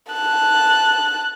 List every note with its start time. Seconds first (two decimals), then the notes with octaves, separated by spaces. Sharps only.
0.13 A5 F#6